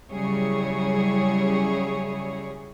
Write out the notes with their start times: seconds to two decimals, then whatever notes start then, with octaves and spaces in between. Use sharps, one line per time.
0.11 C#3 F#3 G3 E4 G#4 C#5